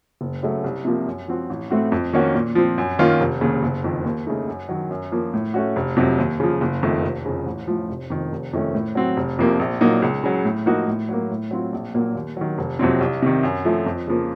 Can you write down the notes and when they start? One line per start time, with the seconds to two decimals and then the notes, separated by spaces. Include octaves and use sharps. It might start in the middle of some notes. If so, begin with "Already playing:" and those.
0.21 F#1
0.43 F#2 C#3 F#3 A3
0.64 C2
0.85 C3 F3 A#3
1.06 F#2
1.28 F3 C4 F#4
1.50 A1
1.70 A2 A3 C4 F#4
1.92 F2
2.13 D#3 A#3 C#4 F#4
2.35 A#2
2.55 F3 C4
2.78 F#2
2.99 D#3 A#3 C#4 F4
3.20 F1
3.41 D#2 C#3
3.63 F#1
3.84 F2 D#3
4.05 D#2
4.27 C#3 A3 D#4
4.48 F#2
4.69 D#3 F#3
4.91 F#2
5.12 F3 A#3
5.34 A2
5.54 A3 C#4 F#4
5.76 F1
5.96 F2 C3 F#3
6.18 D#2
6.40 C#3 F3
6.61 F#1
6.83 F2 D#3 A3
7.04 F1
7.26 F2 C#3
7.46 A1
7.67 A2 F3
7.89 F1
8.10 F2 D#3
8.32 F1
8.53 F2 D#3 A3 C#4
8.75 A2
8.95 F#3 C4 F#4
9.17 F1
9.39 F2 C3 F3 A#3
9.59 A#1
9.81 A#2 F#3 A#3 D#4
10.02 C#2
10.24 C#3 F#3
10.45 A2
10.66 F3 A#3 D#4 F#4
10.88 A2
11.09 F#3 A#3
11.30 A2
11.51 F#3 C4 F4
11.73 A#1
11.94 A#2 F#3 A#3
12.15 D#2
12.37 D#3 F#3
12.58 F1
12.79 F2 C3 F#3 C4
13.01 C2
13.22 C3 D#3
13.43 F#2
13.65 F3 A3
13.86 F2
14.07 C#3 F3 A#3